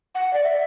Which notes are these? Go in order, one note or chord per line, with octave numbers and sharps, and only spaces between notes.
F#5
D5
E5